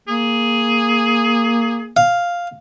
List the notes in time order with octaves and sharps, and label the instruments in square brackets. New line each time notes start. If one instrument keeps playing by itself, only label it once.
[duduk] A#3 [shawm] G#4
[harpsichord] F5